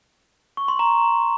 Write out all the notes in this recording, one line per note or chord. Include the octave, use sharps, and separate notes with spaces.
C#6
C6
A#5